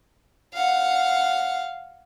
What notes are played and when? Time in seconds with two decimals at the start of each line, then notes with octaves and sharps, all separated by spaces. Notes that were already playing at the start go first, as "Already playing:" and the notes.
0.54 F5 F#5